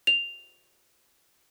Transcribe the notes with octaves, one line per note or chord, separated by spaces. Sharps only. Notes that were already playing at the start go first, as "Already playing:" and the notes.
F7